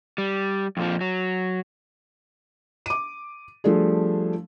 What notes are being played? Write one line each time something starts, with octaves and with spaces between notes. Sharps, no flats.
G3
F2 A#2 F3
F#3
D6 D#7
F3 G3 A3 D4 G#4